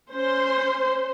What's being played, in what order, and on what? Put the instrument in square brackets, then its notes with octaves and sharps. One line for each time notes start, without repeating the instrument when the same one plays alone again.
[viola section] C#4 C5 C6